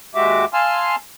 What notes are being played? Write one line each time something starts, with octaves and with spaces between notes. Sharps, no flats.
D#2 G#3 F#4 G4 E5 D6
F5 G#5 A5 C6 E6 F6